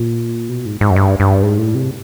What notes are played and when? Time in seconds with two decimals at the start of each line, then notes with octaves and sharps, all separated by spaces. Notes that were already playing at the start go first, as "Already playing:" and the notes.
Already playing: A#2
0.49 B2
0.66 G#2
0.81 G#2
0.90 F#2
0.96 G2
1.20 G2
1.43 G#2
1.58 A2
1.75 C3